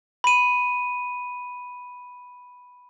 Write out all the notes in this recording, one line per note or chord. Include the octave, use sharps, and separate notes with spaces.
B5 D#7